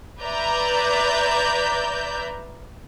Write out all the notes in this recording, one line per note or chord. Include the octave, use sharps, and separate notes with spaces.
B4 D5 E5 A#5 G6